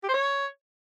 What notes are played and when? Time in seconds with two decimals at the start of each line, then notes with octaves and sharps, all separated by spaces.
0.04 G4
0.09 C5
0.14 C#5